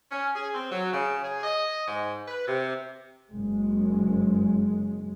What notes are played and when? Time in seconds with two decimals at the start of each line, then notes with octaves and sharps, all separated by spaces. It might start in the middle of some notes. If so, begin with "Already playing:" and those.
0.11 C#4
0.35 G#4
0.55 C4
0.71 F#3
0.93 C#3
1.23 G#4
1.44 D#5
1.88 G#2
2.28 B4
2.46 C3
3.31 F#1 G#3